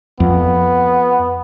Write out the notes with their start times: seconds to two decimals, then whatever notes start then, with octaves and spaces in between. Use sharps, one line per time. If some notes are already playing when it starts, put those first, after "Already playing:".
0.20 F2 B3